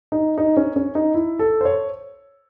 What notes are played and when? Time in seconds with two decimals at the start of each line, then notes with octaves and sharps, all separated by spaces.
0.12 D#4
0.38 D#4
0.57 C#4
0.76 C#4
0.95 D#4
1.14 E4
1.39 A4
1.61 C5
1.65 C#5